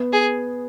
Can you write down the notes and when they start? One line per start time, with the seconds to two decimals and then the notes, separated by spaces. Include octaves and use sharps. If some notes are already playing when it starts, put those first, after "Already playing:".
Already playing: B3
0.13 G#4